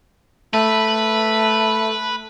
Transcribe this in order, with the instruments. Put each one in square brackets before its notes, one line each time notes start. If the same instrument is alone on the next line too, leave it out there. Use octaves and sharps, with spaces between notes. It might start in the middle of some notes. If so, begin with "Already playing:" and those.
[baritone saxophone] A3 [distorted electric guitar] B4